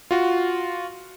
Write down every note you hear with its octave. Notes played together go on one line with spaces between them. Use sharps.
F4 F#4